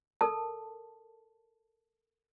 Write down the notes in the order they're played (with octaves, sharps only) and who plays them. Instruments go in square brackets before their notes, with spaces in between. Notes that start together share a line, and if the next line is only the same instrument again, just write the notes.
[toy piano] A4 A#4 A5